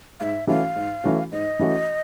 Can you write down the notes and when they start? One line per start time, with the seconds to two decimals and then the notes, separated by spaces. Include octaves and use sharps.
0.20 G#2 E5 F5
0.47 E3 A3 C#4 F#4 F5
0.75 G#2
1.04 E3 A3 C#4 F#4
1.32 G#2 D#5
1.59 E3 A3 C#4 F#4